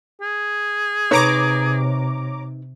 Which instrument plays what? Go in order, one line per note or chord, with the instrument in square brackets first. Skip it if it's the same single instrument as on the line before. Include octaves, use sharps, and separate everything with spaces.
[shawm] G#4
[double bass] C3 [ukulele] D#4 B4 [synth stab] C#5 A#5 D6